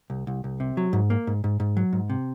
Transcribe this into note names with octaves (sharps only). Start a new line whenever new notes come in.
C2
C2
C2
C3
F#3
G#2
A#3
G#2
G#2
G#2
F#3
G#2
C3